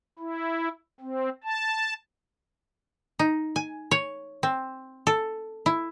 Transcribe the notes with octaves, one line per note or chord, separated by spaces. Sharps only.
E4
C4
A5
D#4
G#5
C#5
C4
A4
E4